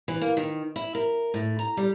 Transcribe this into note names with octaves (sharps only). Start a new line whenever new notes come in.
E3
A#3
D#3
E4
A#4
A2
A#5
G3